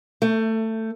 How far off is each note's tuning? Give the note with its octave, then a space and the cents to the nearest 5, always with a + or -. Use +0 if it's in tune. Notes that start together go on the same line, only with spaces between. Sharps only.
A3 +20